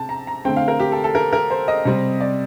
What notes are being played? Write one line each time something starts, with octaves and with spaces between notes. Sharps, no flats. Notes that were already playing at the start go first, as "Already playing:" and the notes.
Already playing: C3 A5
A#5
A#5
D3 A3 C4 G5
F5
A#4
G4
A4
A4
A#4
A#4
C5
D#5
C3 G3 C4
D5